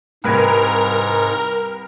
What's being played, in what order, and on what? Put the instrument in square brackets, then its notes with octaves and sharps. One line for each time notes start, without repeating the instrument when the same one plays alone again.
[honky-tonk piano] C2 B4 G#6 [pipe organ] G#2 [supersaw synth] A#4